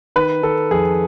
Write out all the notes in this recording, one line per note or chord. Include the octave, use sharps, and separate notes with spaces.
D#3 B4
D#3 A4
F2 G#4